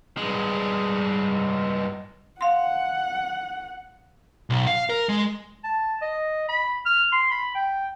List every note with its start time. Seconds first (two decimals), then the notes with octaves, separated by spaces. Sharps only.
0.17 G2 G#3
2.41 F5 F#5 C6
4.50 B1
4.67 F5
4.90 A#4
5.09 G#3
5.64 A5
6.02 D#5
6.48 B5
6.85 F6
7.12 C6
7.31 B5
7.55 G5